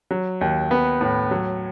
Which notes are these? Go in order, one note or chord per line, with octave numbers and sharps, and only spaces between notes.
F#3
D#2
B3
A2
F#3